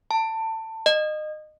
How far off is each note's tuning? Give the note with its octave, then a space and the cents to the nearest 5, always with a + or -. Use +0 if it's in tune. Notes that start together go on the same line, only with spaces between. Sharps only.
A5 +20
D#5 -25